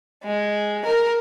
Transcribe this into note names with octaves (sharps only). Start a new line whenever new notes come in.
G#3
A#4